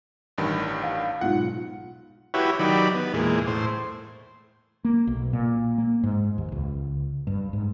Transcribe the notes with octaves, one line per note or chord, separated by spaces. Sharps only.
A1 G2 D#3
F5
B1 G#2 F4 F#5
E4 F#4 G4 B4 C#5
D#3 F#3 G4 D5 B5
B3
E2 A#2 G#3
A2 C5
A#3
B1
A#2
A#3
G#2
D#2
C#2
G2
G#2